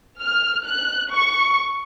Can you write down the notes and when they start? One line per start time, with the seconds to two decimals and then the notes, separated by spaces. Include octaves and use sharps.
0.21 F6
0.64 F#6
1.12 C#6